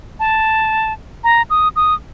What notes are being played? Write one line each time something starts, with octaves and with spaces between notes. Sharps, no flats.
A5
A#5
D#6
D#6